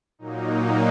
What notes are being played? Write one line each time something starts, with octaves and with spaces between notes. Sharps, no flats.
A#2 F#3 A#3 D#4